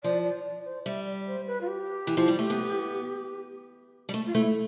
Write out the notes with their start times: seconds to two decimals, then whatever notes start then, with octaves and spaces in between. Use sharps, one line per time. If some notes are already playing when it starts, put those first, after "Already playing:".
0.04 F3 D5
0.24 D5
0.45 D5
0.65 C5
0.86 G3 E5
1.06 D5
1.27 C5
1.47 B4
1.61 F4
1.68 G4
2.07 E3
2.17 F3
2.28 G3
2.39 A3
2.50 B3
4.09 G3
4.14 A3
4.26 F4
4.34 A3 E4